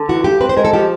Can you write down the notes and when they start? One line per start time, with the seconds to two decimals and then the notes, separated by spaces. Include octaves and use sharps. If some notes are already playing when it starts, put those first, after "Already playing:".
Already playing: D3
0.09 E3 F#4
0.24 G2 G4
0.41 C4 B4
0.49 C5
0.57 G#3 A#4
0.65 A4
0.73 F3 G4